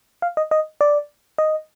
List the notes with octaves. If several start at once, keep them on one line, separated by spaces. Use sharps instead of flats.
F5
D#5
D#5
D5
D#5